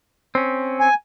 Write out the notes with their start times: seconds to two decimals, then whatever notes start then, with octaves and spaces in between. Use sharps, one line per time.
0.35 C4 C#4
0.80 G#5